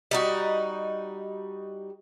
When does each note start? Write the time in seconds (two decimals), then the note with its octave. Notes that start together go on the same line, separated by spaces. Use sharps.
0.11 G3 D#4 F#4